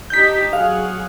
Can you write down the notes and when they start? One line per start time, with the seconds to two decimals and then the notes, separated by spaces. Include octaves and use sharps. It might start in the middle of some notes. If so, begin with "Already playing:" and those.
0.10 D4 D#4 G4 G6 B6
0.53 F#3 G#4 F5 F#5